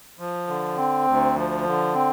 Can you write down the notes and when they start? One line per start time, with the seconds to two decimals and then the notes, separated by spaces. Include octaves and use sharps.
0.19 F3
0.47 D3
0.77 C4
1.06 D2
1.36 F3
1.65 D3
1.95 C4